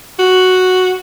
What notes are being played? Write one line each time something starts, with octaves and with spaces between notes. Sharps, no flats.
F#4